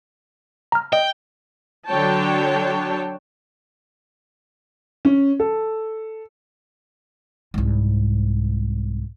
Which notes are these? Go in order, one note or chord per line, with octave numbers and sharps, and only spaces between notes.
A#5 F6
D#5 G5
D3 F#3 D4 C#5 G5 A5
C#4
A4
C2 G#2